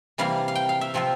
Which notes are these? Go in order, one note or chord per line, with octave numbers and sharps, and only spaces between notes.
C3 E3 G3 A#3 F5
F5
G5
F5
E5
C3 F3 C4 F4